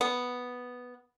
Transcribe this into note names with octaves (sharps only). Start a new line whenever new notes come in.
B3